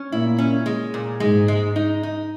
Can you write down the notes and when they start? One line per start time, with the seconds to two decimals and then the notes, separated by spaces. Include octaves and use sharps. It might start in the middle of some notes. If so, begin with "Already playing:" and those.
Already playing: C#4
0.12 A#2 E4
0.39 C#4
0.66 G#3
0.94 A#2
1.20 G#2 G#3
1.48 G#3
1.76 D#4
2.03 D#4